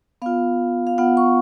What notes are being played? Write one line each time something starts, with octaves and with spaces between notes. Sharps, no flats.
B3 F4 F5
F5
B3 F4 F#5
C#6